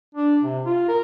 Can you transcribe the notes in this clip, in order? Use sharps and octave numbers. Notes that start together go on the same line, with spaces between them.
D4
C3
F4
A#4